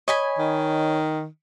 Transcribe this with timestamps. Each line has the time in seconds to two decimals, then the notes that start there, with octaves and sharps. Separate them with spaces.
0.08 C#5 D#5 G#5 B5
0.39 D#3